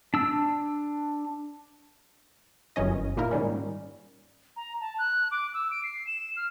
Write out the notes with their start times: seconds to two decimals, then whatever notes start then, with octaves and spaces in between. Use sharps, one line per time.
0.14 D4 E6
2.76 G1 F#2 E3 C#4 D#5
3.17 A#2 A#3 D#4 E4 A#4
3.31 G#2 D#3 G3 C#4
4.56 A#5
4.81 A5
4.99 F#6
5.31 D6
5.54 E6
5.71 D7
5.84 C7
6.07 E7
6.37 F6